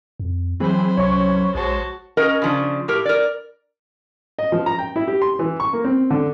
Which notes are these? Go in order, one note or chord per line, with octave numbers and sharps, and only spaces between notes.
F2
E3 F#3 C4 G#4 C5 B5
C2 C#4 C#5 C#6
A#1 G#3 F#4 C5 A5
C#4 A#4 D#5
C#3 F3 D4
A2 G4 A#4
A#4 D5
D#5
F3
A#5
G5
E4
G4
C6
E3
C#6
A#3
C4
D3